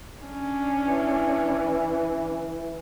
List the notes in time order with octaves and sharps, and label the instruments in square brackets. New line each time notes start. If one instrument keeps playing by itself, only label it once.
[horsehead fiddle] C#4 D4
[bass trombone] E3